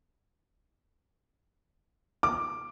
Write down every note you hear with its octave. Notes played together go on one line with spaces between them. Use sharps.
D6